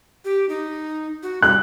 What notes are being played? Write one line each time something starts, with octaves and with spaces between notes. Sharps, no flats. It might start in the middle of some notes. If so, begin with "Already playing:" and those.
G4
D#4
F#4
G3 F#6